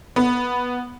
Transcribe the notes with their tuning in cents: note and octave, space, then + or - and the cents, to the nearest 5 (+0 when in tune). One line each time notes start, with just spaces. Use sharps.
B3 -5